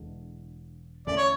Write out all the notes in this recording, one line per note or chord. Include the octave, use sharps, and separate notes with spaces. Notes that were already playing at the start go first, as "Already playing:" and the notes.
Already playing: E1 E2 D3 G#3
E2 D3 A3 C#4 D5
C#5